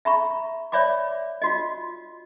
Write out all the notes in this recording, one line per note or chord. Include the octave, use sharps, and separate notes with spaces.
E5 A#5 B5 C#6
C#5 D5 E5 B5 D6
F4 F#4 D#5